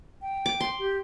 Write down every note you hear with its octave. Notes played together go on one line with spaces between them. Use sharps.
G5
D6
C6
G4